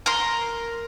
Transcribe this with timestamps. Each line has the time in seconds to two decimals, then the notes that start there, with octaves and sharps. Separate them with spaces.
0.06 A#4 C6